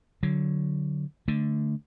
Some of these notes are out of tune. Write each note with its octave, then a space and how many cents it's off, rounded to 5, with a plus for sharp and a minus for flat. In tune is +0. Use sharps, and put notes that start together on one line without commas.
D3 +0 F#3 +0
D3 +0 A3 +0